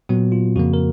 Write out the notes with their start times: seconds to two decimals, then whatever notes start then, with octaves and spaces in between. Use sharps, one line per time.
0.09 A#2 F#3 B3 F#4
0.32 F4
0.56 F2 C#3 F3 A#3 F#4
0.74 A#4